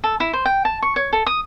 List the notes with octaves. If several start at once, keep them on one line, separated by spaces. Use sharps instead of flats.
A4
E4
C5
G5
A5
C#6
C#5
A4
D#6